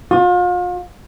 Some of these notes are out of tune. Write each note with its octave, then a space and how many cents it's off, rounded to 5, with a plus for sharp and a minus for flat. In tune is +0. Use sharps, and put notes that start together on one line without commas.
F4 +40